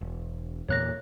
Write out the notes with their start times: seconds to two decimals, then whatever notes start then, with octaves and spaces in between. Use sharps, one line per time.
0.01 E1
0.69 E2 A#2 A#3 C#5 F#6 A#6